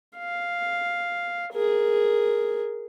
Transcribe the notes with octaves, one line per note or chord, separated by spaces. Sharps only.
F5
G#4 A#4